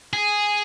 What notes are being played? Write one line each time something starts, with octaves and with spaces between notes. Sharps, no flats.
G#4